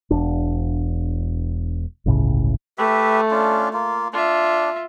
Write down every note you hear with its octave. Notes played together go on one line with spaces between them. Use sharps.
E1 D4
G1 C#2 A2 C#3
A3 G4 B4 E5
C#4 D4 F4
A#3 F4
D4 F4 E5